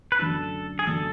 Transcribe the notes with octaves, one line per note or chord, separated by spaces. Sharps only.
B4
F#2 D3 A3 D4 A4
G#4
F#2 D3 A3 D4 A4